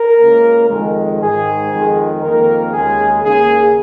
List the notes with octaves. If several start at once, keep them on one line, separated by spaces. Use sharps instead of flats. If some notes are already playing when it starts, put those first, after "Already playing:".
Already playing: A#4
C#2 C#3 A#3
F2 D#3 G#3
G#2 D#3 G#3 G#4
F2 D#3 G#3
F2 D#3 A#3 A#4
D#2 C#3 G#3 G#4
D#2 C#3 A#3 G#4